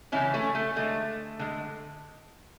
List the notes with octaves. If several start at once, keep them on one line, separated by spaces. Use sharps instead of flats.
C#3 E3 G#3 C#4 E4
A3 C#4
A3
D3 G#3 A3
D3 G#3